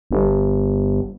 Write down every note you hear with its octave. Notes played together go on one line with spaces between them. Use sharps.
G1